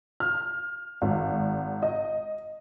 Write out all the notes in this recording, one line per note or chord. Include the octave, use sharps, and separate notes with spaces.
F6
G#1
D#5